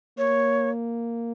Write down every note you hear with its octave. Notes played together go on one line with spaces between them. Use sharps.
A#3 C#5